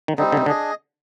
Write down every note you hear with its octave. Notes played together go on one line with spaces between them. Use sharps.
D#3
D3 G3 C4 D#4
D3
C3
D3 D4 G#4 D#5